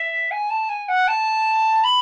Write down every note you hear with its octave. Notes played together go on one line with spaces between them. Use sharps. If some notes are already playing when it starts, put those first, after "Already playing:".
Already playing: E5
G#5
A5
G#5
F#5
A5
B5